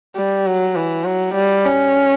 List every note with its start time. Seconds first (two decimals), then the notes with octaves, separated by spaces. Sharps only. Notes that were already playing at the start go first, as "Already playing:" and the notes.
0.16 G3
0.46 F#3
0.76 E3
1.05 F#3
1.35 G3
1.65 C#4